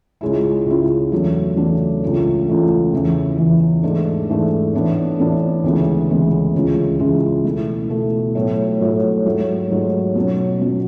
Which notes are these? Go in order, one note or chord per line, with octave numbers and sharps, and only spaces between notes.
C#2 C#3 G#3 C#4 E4
C#2 C#3 G#3 C#4 E4
E2 C#3 F#3 A3 D4
E2 C#3 F#3 A3 D4
C#2 C#3 E3 A3
C#2 C#3 E3 A3
E2 C#3 E3
E2 C#3 E3
G#2 E3 A3 D4
G#2 E3 A3 D4
A2 E3 B3 D4
A2 E3 B3 D4
D2 C#3 E3 G#3 B3
D2 C#3 E3 G#3 B3
C#2 C#3 E3 G#3 C#4
C#2 C#3 E3 G#3 C#4
B2 A3 E4
B2 A3 E4
A2 F#3 A3 E4
A2 F#3 A3 E4
G#2 F#3 A3
G#2 F#3 A3
B2 F#3 C#4
B2 F#3 C#4